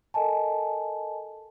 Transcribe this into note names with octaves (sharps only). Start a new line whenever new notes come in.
A4 A#4 D#5 G#5 A5